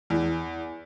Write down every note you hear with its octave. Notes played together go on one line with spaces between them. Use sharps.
E2